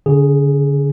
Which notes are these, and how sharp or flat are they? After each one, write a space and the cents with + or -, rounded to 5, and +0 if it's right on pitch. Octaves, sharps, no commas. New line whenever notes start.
D3 -35 G#4 +0